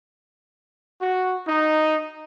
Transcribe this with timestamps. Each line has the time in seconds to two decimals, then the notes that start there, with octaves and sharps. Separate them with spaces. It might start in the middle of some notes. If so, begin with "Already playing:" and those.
1.02 F#4
1.48 D#4